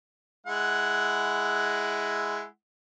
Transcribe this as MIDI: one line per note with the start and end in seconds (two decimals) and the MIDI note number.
0.46 2.44 56
0.46 2.44 64
0.46 2.44 78